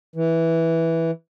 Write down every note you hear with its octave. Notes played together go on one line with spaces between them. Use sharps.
E3